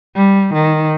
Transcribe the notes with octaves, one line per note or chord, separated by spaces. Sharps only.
G3
D#3